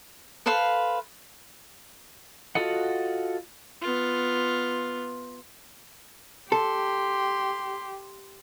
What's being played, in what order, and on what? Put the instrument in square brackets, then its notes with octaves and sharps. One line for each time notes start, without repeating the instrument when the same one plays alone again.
[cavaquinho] A4 B4 C5 F5
[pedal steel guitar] F4 F#4 A4 D#5 F#5
[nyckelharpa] B3 F4
[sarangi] G4 [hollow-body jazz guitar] A4 [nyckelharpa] C6